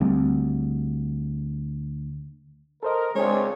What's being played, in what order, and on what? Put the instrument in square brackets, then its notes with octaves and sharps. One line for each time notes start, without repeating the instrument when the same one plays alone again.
[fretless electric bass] D2 G3 C4
[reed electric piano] A4 C5 D#5 [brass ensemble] A#4
[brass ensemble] C#2 [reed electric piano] G#3 G#4 [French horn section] C4 D4 [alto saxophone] C#5